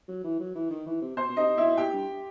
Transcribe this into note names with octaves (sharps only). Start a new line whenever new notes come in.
F#3
E3
F#3
E3
D#3
E3
C3
B2 C5
B2
C3 D#4 D#5
B2 E4 E5
B2 G4 G5
G2